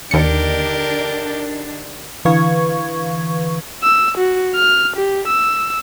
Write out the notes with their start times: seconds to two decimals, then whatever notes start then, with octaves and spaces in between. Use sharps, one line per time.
0.11 D#2 D3 D4 D#4 G4 A#4 C#7
2.25 D3 E3 B4 F5 C#6 G#6
3.83 E6
4.18 F#4
4.56 F6
4.97 G4
5.28 E6